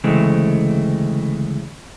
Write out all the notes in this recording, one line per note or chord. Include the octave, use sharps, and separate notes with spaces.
D2 C#3 E3 G#3 A3 C4